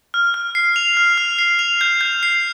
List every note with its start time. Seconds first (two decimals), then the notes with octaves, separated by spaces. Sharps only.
0.14 F6
0.34 F6
0.55 C7
0.76 F7
0.97 F6
1.18 F6
1.39 C7
1.59 F7
1.81 G6
2.01 G6
2.23 C7